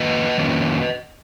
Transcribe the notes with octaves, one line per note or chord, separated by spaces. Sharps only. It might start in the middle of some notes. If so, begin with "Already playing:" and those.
Already playing: F2 D#3 A#3 B4 D#5
F2 D#3 A#3 C#4